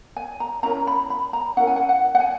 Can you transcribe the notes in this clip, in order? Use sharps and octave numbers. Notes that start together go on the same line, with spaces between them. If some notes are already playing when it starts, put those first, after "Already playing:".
G#5
A#5
C#4 E4 A#4 A#5
B5
B5
A#5
C#4 E4 A#4 F#5
G#5
F#5
F#5
F#5
G#5